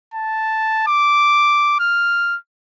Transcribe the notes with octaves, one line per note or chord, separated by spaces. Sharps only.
A5
D6
F6